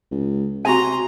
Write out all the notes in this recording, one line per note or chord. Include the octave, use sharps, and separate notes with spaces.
C#2
C3 F#4 G#5 A#5 C6